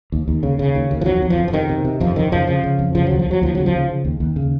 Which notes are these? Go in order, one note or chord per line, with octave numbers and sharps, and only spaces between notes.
D#2
D#2
C#3
C#3
D#2
D#2
F3
F2 F#3
F2
F3
F2
F3
C3 D#3
C3
C3
F2 F3
F2 D#3
C#3 F3
C#3 F3
C#3
F2
C#3 F3
D#2 F#3
F3
D#2 F#3
D#2 F3
C#3 F#3
F3
C#3
C#3
D#2
D#2
C#3